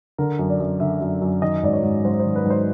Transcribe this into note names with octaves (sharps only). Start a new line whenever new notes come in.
D3 A#4
F#2
D5
F#2
D3 E5
F#2
F#2
D#3 D#5
G#2 D5
C#5
G#2
G#2 C5
C5
D#3
B4
G#2 C5